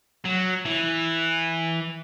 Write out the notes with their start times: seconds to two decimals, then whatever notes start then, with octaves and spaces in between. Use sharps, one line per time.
0.25 F#3
0.66 E3